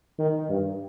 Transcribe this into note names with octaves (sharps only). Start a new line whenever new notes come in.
D#3
G2